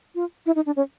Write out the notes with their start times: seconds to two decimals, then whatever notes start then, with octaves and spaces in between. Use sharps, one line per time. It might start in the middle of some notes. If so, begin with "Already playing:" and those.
0.15 F4
0.46 E4
0.56 D#4
0.66 D4
0.76 C#4